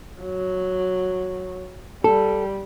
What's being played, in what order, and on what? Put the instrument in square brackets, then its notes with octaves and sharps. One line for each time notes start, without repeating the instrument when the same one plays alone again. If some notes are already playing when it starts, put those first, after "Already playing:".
[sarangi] F#3
[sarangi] G3 [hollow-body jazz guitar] A4